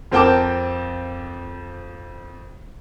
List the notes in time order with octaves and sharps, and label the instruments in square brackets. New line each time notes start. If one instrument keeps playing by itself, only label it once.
[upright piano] F2 C4 A#4 G5 A5 D6